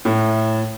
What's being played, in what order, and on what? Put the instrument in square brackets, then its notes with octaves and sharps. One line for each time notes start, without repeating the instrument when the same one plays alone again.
[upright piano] A2